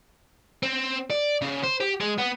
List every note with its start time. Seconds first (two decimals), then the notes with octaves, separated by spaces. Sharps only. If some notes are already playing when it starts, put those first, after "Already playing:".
0.63 C4
1.11 D5
1.42 C#3
1.64 C5
1.81 G4
2.00 G#3
2.19 B3